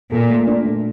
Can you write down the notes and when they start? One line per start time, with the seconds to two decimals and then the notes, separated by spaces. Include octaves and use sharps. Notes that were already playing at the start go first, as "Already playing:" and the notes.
0.12 A#2 A4
0.30 A3
0.47 D4
0.66 A3